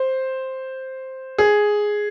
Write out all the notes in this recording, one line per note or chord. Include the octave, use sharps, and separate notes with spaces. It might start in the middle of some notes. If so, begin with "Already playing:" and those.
Already playing: C5
G#4